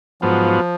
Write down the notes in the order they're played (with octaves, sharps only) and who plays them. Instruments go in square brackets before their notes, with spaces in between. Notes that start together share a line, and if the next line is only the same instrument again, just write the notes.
[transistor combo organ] G#2 F#3 B3 F4 [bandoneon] F3